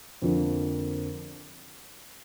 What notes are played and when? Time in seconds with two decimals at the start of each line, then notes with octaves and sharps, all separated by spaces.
0.22 F2 D3 F3 A#3